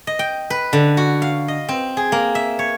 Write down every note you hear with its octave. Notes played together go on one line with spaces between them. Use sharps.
D#5
G5
B4
D3
F#4
F5
D#5
C4
G#4
A#3
E5
C#5